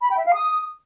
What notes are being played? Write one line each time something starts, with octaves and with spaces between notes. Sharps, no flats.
B5
G5
E5
F5
D#6